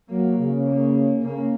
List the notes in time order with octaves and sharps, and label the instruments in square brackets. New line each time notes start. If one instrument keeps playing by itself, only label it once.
[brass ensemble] F#3 [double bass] A#3
[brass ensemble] C#3
[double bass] A#3
[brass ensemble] C#3 [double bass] A#3